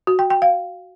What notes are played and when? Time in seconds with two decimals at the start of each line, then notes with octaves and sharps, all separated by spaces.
0.07 F#4
0.19 G5
0.30 G5
0.42 F5